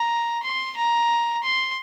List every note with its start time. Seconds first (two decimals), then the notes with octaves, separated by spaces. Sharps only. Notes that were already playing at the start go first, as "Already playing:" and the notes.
Already playing: A#5
0.43 C6
0.77 A#5
1.43 C6